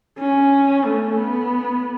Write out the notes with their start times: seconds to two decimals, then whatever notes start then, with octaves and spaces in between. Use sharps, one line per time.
0.19 C#4
0.85 A3
1.17 B3